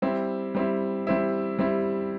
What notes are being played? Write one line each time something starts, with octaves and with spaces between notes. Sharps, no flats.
G3 C4 E4
G3 C4 E4
G3 C4 E4
G3 C4 E4